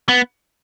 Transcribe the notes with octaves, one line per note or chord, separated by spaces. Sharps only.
B3